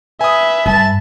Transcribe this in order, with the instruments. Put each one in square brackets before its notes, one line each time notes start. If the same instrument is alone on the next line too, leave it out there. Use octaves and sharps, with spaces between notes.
[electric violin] B4 E5 [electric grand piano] G#5 D#6
[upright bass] G2 [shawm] A5